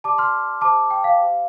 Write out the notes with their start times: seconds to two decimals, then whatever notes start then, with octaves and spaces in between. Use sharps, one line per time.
0.04 G4 D5 A5 D6
0.18 C6 F6
0.61 G4 C5 A5 D6
0.90 G5
1.04 F5
1.18 G4 C5